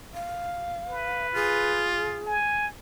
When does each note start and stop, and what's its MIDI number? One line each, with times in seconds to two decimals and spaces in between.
0.14 1.27 77
0.89 1.92 71
1.35 2.27 65
1.35 2.34 68
2.27 2.67 80